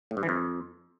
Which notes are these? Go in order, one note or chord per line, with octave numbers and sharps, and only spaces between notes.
A2
G2
E3
F2